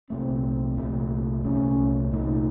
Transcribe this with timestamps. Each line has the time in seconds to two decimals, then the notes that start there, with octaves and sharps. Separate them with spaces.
0.10 C2 A#2 A3 C4
0.77 C2 A#2 A3
1.44 C2 A#2 A3 C#4
2.12 C2 A#2 A3 D#4